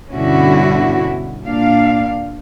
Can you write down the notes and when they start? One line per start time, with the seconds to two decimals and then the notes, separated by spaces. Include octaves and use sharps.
0.13 G2 B2 D3 C#4 E4 F#4
1.44 A#2 D4 F5